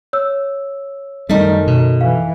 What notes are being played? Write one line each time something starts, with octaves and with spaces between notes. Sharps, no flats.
C#5 E6
F#2 D#3 G3 A3 D#4
B2
E3 F5